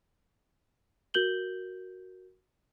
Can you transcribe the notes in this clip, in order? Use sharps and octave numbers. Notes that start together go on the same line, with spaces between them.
F#4 A#4 G6 F#7 G7